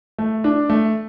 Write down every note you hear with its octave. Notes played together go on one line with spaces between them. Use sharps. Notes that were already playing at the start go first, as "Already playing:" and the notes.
A3
D4
A3